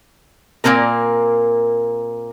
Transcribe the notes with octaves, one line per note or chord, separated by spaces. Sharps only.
A#2 F#3 A#3 C4 A#4